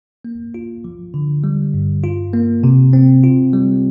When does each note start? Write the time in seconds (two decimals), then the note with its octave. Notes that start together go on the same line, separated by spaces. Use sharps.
0.25 A#3
0.54 F4
0.84 F3
1.14 D3
1.44 G3
1.74 G2
2.04 F4
2.33 A#3
2.64 C3
2.93 C4
3.23 F4
3.53 G3